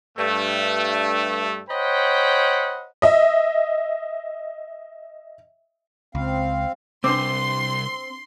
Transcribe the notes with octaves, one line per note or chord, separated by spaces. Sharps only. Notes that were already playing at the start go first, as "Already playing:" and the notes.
G2 A3
C5 C#5 D#5 F#5 G5 B5
D#5 E5
C#2 C4 F5
C2 C4 D4 B4 C6 D6